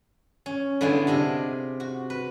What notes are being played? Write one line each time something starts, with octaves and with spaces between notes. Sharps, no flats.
C#4
D3 B3 E4 F4 G#4
C3 D4 D#5
F#4
B4